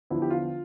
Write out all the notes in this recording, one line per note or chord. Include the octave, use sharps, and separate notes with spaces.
E2 D3 F3 E4
G4
F4